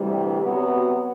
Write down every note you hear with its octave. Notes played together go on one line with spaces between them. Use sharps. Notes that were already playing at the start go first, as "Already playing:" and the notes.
Already playing: D2 C3 E3 G3
C3 F#3 B3 F#4